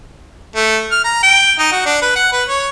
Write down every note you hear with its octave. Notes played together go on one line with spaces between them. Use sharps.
A3
F6
A#5
G5
D#4
F#4
D4
B4
F#5
B4
C#5